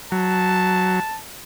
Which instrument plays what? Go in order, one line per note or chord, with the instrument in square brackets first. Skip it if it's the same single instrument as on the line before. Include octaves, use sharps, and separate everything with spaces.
[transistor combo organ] F#3 [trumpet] A5